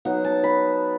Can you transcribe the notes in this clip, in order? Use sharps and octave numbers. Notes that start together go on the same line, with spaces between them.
F#3 B3 D#4 F#5
A5
B5